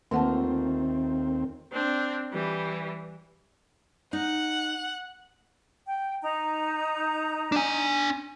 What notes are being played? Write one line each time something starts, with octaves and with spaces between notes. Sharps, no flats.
D#2 D#3 A3 A#3 C4 F4 F#5 A5
C4 D4
E3 G3
D#4 F#5
G5
D#4 A#5
D4 G#5